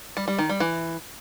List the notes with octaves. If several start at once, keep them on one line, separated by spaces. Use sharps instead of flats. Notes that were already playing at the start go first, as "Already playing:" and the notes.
G3
G3
D#3
G3
E3